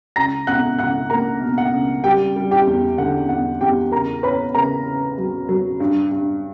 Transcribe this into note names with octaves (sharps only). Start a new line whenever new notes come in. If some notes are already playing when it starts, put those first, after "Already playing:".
C#2 A#5 A#6
B2 F#5 F#6
C#2 F#5 F#6
A#3 A#4 A#5
B2
F#5
C#2
G3 G4 G5
G3
G4 G5
E2
D3 F#5
E2 F#5
E2 G4 G5
C#3 A#4 A#5
C#4 B4 B5
C#3 A#4 A#5
C#3
F#3
F#3
G2
G2